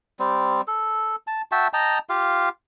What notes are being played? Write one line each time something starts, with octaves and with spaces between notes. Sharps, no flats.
G3 C4
A4
A5
F#4 E5 G5 A5
D#5 G5 A5 A#5
F4 G4 F5